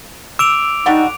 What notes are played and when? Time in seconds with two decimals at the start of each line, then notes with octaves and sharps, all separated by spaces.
0.39 D6 E6 D7 F7
0.86 D3 G3 D#4 F#4